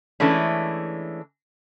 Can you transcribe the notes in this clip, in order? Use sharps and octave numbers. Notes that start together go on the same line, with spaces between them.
E3 G#3 A3 C#4 D4